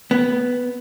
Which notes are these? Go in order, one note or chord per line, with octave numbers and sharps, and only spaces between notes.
B3